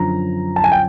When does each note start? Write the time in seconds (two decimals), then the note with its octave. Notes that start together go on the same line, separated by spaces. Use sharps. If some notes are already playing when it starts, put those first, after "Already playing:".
Already playing: F#2 D3 F3 A#5
0.56 A5
0.64 G#5
0.72 G5